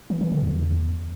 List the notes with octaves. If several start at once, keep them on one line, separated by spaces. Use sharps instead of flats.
E3
E3
D3
E2